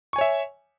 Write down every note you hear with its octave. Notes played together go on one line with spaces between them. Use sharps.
C#5 E5 G#5 C#6